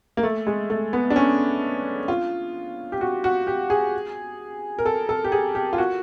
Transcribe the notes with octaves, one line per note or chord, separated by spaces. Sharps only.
A#3
A3
G#3
A3
B3
D4
C#4
F4
G4
F#4
F#4
G4
G#4
A#4
A4
A4
G4
G#4
G4
F4
F#4